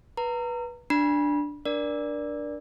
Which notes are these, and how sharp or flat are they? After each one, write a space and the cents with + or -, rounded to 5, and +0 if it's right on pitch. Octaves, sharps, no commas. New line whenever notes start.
B4 -20 A#5 -25
D4 +0 B5 -30
D4 +0 A#4 +30 D5 +0